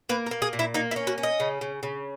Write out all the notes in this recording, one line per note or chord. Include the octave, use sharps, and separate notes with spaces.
A#3 B4
A#4
A#3
G#4
A#2
E4
A#3 D#4
E4
C#4
F#4
C#4
D#5
C#3
C#3
C#3